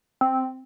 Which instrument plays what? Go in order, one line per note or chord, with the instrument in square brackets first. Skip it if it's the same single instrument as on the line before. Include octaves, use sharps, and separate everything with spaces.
[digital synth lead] C4